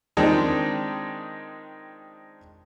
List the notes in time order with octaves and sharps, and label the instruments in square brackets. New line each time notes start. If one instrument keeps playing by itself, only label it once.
[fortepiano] D#3 F3 G#3 C4 D4 D#4